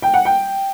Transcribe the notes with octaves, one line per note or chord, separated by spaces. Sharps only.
G5
F#5
G5